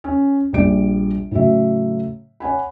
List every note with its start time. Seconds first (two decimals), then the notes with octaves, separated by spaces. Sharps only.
0.04 C#4
0.53 A#1 G3 D5 D7
1.31 A2 C#3 F#3 E5
2.40 C#5 F#5 G#5 B5